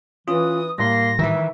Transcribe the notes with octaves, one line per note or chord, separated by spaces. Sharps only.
E3 C#4 F4 D#6
A2 G3 A#3 C6 A#6
D#3 E3 E4 E5